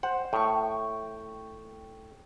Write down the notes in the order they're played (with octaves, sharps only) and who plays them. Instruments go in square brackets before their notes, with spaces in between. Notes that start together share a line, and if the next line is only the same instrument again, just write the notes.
[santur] C5 [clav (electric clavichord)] F#5
[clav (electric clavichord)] A2 [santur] G5 C#6